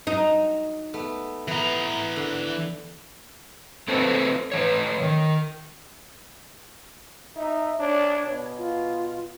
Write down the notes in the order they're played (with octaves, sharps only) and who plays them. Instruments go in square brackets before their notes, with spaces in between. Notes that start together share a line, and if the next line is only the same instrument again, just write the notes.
[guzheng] F#3 [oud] D#4
[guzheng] A3 B3
[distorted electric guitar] E3 A#5 [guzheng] B3 B4
[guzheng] D3
[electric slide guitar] A3 A#3 C4 A4 B4 C5
A2 E3 C#5
D#3
[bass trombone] D#4 [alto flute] E5
[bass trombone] D4 [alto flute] C#5
[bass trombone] B2
[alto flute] F4